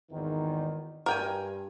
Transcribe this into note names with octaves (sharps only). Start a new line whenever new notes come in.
G#1 E2 D#3
G2 A#4 G5 G#5